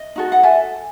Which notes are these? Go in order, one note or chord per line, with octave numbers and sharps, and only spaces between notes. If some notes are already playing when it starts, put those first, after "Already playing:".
Already playing: D#5
D#4 F#4 A4
F#5
A4 E5 G#5